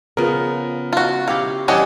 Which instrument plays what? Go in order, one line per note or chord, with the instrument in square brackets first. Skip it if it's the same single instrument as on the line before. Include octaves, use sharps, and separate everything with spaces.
[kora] C#3 F3 [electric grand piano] B3 A#4
[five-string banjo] F4 F#4
[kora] E4 G4 C#5 [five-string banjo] F5
[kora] E3 G3 [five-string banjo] C#4 D4 G4 [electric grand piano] D#5 F#5 G#5